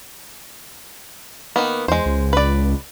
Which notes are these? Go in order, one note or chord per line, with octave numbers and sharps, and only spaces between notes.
D#3 A#3 B3
E2 G#3 C5
C#2
B4 D5